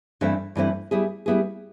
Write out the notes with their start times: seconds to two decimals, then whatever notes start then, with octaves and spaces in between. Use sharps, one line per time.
0.21 G2 E3 A3 C4 E4
0.56 G2 E3 A3 C4 E4
0.91 G3 B3 E4 G#4
1.26 G3 B3 E4 G#4